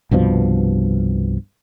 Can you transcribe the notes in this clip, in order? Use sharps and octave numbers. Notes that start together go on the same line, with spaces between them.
C2 G2 B2 F3